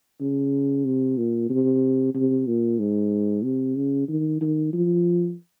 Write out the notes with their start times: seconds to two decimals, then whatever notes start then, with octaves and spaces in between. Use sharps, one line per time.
0.21 C#3
0.85 C3
1.18 A#2
1.50 C3
2.15 C3
2.47 A#2
2.79 G#2
3.44 C3
3.76 C#3
4.08 D#3
4.41 D#3
4.73 F3